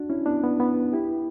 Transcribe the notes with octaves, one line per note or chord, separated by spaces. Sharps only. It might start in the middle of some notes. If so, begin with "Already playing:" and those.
Already playing: D4 F#4
C#4 E4
B3 D4
B3
B3
E4 G4